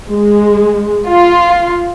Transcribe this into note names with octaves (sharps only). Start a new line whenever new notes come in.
G#3
F4